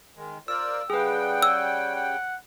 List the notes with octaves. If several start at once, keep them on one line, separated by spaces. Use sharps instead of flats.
D#3 G#3
F4 A#4 C5 D5 E6
C#3 G3 G#4 B4 F#5 G5
C#5 E6
F#5